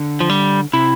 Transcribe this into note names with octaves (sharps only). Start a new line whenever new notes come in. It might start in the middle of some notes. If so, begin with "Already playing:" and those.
Already playing: D3
F3
G3
C3 E4